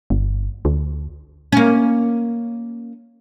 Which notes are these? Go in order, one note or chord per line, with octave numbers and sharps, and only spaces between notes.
G1
D2
A#3 C#4